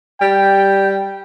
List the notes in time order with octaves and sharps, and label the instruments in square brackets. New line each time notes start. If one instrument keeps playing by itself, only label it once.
[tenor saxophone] G3 [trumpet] G5